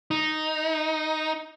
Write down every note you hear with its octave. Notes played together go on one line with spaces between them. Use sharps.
D#4